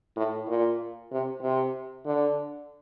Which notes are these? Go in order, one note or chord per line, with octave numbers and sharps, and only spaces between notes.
A2
A#2
C3
C3
D3